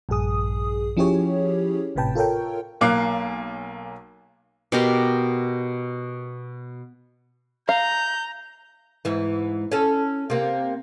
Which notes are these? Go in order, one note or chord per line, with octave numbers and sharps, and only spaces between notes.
A#1 G2 G#4 D#6
F3 C#4 E4 G4 G#4 C#5
G#1 A2 C3 B4 G5 A5
F4 A4 A#4 C#5 G5
B1 A#3 D6 F#6 C7
B2 G4 A#4 C6
F5 A#5 G6
G#2 E3
C#4 A4
C3 A#3